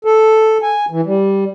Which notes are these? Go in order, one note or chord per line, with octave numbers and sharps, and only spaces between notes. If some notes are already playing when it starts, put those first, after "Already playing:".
A4
G#5
E3
G3